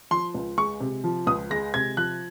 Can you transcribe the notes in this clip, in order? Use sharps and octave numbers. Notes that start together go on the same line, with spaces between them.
F3 C6
C#2
G#3 C#6
C3
F3
C#2 D#6
G#3 A#6
C3 G#6
F3 F#6